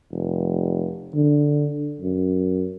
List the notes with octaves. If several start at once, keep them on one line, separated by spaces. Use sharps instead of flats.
F1
D3
F#2